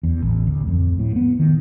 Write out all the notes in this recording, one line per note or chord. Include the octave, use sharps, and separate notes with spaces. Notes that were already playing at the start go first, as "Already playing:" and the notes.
E2
A1
D2
F2
A2
B3
D#3